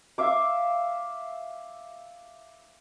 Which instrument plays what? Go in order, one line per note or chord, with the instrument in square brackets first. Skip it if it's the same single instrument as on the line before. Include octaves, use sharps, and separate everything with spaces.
[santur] E5 F5 D6